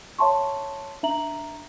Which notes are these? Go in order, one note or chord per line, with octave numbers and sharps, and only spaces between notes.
C#5 E5 A5 C6 C#6
D4 E5 A#5 F#7